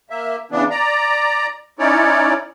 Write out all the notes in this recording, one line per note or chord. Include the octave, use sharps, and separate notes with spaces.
A#3 E5
C#3 E3 B3 D4
D5 A#5
C#4 D#4 E4 C#5 D5